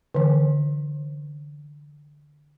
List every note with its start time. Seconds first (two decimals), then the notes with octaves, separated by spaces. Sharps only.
0.15 D3 E3